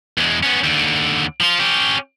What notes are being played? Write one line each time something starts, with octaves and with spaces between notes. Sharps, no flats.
E2 G#3
B3 C#4
D#2 D3
F3 F4
C#4 G4